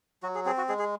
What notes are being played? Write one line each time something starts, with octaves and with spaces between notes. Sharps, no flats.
F#3 F#4
G#4
C4 G#4
F#4
G#3 G#4
G#4